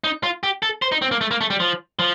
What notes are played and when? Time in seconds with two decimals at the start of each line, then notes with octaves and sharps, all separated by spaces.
0.04 D#4
0.23 F4
0.43 G4
0.62 A4
0.82 C5
0.92 D#4
1.02 C4
1.11 A#3
1.21 A3
1.31 A#3
1.41 A3
1.50 G3
1.60 F3
1.99 F3